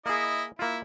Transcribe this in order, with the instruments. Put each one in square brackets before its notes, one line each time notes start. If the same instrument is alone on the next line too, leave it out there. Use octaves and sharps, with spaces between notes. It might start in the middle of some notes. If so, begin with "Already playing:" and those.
[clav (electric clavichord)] A#3 G#4 [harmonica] E4 D#5
[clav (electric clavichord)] A#3 F4 [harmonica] E4